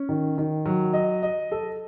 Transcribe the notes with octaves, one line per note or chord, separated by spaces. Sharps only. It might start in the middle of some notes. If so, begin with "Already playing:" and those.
Already playing: C#4
D#3
D#3
F#3
D#5
D#5
A4